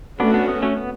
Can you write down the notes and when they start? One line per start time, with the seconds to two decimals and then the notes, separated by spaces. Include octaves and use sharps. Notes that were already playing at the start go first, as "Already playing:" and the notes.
0.19 A3 B3 C#4 D4 F#4
0.34 B3 D4
0.48 B3
0.62 A3 C#4
0.77 B3